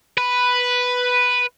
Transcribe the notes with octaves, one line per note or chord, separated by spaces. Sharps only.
B4